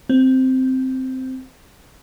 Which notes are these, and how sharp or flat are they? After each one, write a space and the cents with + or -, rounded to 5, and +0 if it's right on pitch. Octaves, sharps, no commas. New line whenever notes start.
C4 -5